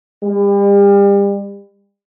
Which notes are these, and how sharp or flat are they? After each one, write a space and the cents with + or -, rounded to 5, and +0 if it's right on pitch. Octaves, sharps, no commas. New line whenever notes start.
G3 +35